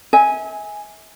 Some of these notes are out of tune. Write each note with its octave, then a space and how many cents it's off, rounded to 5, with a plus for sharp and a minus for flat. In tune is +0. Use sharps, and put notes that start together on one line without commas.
E5 -35 G#5 +0